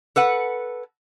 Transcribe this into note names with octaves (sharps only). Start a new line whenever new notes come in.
A4 B4 F#5